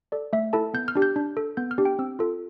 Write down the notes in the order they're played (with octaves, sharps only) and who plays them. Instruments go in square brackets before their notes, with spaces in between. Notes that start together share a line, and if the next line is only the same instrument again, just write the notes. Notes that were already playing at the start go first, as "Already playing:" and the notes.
[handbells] A4 D5
A3 E5
E4 A4 A5
B3 G6
F6
D4 G4
G6
D4
A4
B3 G6
F6
D4 G4
G5
C4 E6
F4 A4